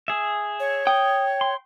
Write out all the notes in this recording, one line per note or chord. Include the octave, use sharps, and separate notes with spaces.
G#4 E5
C#5
G5 D#6
C6